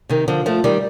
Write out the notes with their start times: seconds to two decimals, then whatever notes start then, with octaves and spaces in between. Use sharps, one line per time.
0.09 C3 D#3
0.28 D3 F3
0.46 F3 A3
0.64 D#3 G3